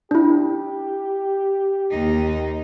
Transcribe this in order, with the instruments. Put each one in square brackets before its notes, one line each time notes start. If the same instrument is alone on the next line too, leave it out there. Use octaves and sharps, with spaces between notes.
[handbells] D4 E4 [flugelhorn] G4
[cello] D#2 D#4